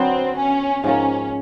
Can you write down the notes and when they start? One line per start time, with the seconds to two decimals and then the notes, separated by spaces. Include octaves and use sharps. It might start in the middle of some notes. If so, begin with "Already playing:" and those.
Already playing: D3 F#3 B3 C4
0.38 C#4
0.84 G#2 F3 A#3 C#4